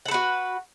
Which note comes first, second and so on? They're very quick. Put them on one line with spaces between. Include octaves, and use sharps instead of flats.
F#5 A4 B4 F#4